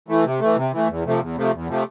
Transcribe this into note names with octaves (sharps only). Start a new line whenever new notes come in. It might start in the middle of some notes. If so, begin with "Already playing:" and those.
E3 A3
C3
E3 A3
C3
E3 A3
E2
C3 F3 A3
E2
C3 F3 A3
E2
C3 F3 A3